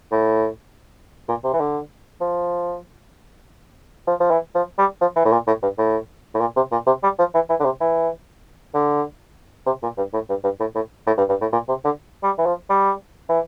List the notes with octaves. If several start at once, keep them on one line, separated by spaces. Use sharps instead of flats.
A2
A#2
C3
E3
D3
F3
F3
F3
E3
F3
G3
F3
E3
A2
A#2
A2
G2
A2
A2
A#2
C3
A#2
C3
G3
F3
E3
E3
D3
C3
E3
D3
C3
A#2
G2
A2
G2
G2
A2
A2
A2
G2
G2
A2
A#2
C3
D3
G3
E3
F3
G3
E3